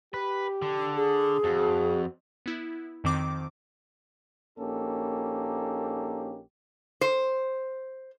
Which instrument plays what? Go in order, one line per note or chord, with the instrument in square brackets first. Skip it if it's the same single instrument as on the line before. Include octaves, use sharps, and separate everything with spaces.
[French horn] G4 [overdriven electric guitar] B4
[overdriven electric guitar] D3
[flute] G#4
[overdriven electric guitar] F2 [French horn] F#4
[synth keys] B3 E4
F2 D#3 C4 D6
[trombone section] A#1 A#3 C#4 D#4 G4 A4
[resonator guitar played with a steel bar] C5